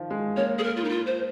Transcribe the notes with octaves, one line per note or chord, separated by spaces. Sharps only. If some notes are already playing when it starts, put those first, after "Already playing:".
Already playing: D#3 F3
G#3
A#3 C#5
G#4
A#4
F4
D#4
F4
C5